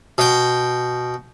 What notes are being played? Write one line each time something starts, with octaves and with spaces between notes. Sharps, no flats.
B2 G5